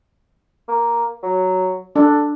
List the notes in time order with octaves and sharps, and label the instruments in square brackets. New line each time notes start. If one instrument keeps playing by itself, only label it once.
[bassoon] A#3
F#3
[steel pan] D4 [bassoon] A4